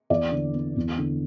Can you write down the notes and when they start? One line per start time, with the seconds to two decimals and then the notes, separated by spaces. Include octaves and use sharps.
0.10 E2 D5
0.32 D3
0.54 B3
0.76 E2
0.98 D3